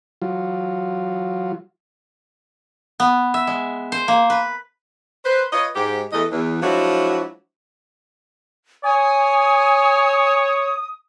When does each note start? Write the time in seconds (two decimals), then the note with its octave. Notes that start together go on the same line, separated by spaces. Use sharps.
0.22 F#3 F4
3.00 B3
3.34 E5
3.47 G#3
3.92 C5
4.08 A#3
4.30 B4
5.24 B4 C5
5.52 F4 B4 C#5 D#5
5.76 G#2 G4
6.12 E2 E3 A3 A4 D#5
6.31 E2
6.62 F3 F#3 G#3 D4 E4 F#4
8.84 C#5 G#5 D#6